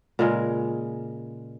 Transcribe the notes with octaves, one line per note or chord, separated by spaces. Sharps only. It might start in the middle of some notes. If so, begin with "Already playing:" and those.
A#2 C#3 G#3 A#4